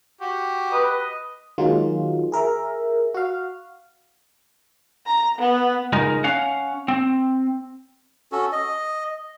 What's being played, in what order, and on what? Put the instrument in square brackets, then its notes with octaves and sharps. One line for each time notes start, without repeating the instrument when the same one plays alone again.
[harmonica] F#4 G4
[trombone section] B4 [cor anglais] D#5
[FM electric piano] D#3 F#3 G#3 A#3 F4
G#4 A#4 E5 A#5
F#4 F5
[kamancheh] A#5
B3
[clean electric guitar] C#2 G#3 D#4 A#4
C#4 F5 F#5
C4
[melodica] C#4 F#4 A4
D#5